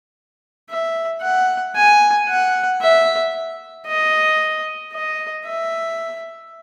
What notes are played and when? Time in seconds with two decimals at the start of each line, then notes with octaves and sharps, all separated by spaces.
0.70 E5
1.22 F#5
1.75 G#5
2.29 F#5
2.81 E5
3.87 D#5
4.92 D#5
5.45 E5